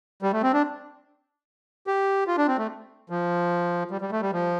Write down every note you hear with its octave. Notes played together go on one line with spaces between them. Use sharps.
G3
A3
C4
D4
G4
F4
D4
C4
A3
F3
G3
G3
A3
G3
F3